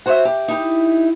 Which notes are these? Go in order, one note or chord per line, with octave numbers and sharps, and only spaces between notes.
F#4 C5 C#5 D#5 E5
G4
D#4 E4 G4